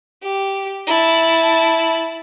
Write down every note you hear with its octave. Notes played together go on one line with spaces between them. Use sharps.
G4
E4 A5